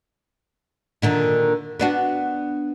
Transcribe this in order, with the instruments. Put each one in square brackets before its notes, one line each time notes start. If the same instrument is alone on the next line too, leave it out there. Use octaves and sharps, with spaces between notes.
[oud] A#2 D3 D#3
B3 D4 F#4